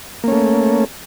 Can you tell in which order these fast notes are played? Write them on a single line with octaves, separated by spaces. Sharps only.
A#3 C#4 A3